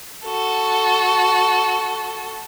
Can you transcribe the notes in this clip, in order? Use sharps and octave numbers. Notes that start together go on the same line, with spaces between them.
F#4 A4